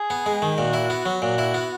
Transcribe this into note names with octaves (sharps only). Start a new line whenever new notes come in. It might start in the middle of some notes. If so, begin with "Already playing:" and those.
Already playing: G#4
B3
G#3
D#3
A#2 F#4
E4
B3
F#3
A#2 F#4
E4
B3